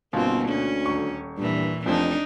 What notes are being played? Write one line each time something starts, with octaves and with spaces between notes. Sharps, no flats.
G1 B2 A#3 C4 F4
D2 C#4
D#1 C#6
G2 A#2 E3
F1 F2 F3 D4 D#4